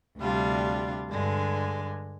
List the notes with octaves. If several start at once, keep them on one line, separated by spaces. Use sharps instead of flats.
D2 C3 G3 D4 F4
G2 D3 G#3